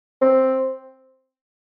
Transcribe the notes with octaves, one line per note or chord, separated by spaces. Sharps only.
C4